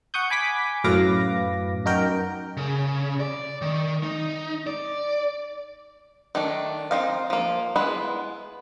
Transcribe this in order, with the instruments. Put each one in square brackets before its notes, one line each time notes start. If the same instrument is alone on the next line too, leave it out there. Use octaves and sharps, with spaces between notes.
[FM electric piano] F#5 C#6 D#6 G6
G#5 B5 D6 B6
F#2 A2 B4 F5 D6 A#6
F#2 D#4 F#4 A#4 G5
[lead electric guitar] C#3
D5
D#3
D#4
D5
[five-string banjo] D#3 A3 D4
C4 D#4 F5
F3 A#3
G#3 B3 E4 B4